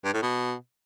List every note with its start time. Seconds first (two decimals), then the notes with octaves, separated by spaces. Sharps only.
0.05 G2
0.13 A2
0.22 B2